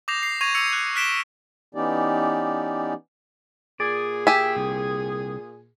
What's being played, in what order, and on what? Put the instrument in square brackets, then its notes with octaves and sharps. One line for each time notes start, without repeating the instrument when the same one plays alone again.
[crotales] D6 D#6 G6 A#6 C7 F7
C7
C#6 G#6 A#6 D#7 F7
E6 G#6 C#7 F7
F#6
F6 F#6 B6 D7 E7 G7
[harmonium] E3 B3 C#4 D#4 G4 D5
[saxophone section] A#2 G#4 [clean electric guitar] D5
[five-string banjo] G4 G#5 [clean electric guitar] E5
[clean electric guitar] C2